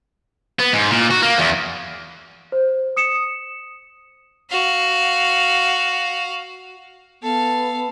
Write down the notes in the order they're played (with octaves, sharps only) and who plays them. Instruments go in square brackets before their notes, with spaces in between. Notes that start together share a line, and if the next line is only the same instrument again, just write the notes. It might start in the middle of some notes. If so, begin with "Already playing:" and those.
[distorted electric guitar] B3
G#2
A#2
F#4
A#3
E2
[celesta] C5
D#6 C#7 E7
[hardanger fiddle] F#4 F5
[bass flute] B3 [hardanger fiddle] A4 F5